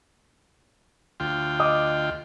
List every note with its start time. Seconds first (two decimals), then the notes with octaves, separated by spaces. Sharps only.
1.20 D2 F4 G5
1.60 D#5 D6 D#6